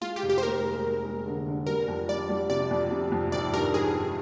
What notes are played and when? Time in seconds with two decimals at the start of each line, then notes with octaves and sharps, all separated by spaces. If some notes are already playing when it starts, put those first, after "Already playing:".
0.01 G#3 F4
0.16 G4
0.23 F1
0.30 G4
0.38 C5
0.43 D#2 A#4
0.63 G#3
0.85 D#2
1.05 G#3
1.26 D3
1.47 D3
1.67 G3 A#4
1.88 F2
2.08 G3 D5
2.29 G3
2.50 C3 D5
2.71 F2
2.91 C3
3.12 F2
3.32 G#1 D5
3.53 G2 A#4
3.74 G#1 G#4
3.94 G#1